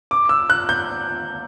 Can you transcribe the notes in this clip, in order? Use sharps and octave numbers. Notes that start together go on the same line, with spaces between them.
D6
E6
F#6
G6